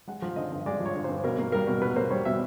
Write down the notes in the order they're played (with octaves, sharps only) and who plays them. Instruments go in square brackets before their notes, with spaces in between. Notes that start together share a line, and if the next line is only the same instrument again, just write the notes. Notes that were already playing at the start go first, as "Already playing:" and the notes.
[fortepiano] G#3 F#5
F3
D3 D#5
G2
G#3 D5
F3
C#5
D3
G2 C5
B2 A#4
A#3
G3 A#4
B2
B2 B4
A#3 C5
G3 C#5
B2 E5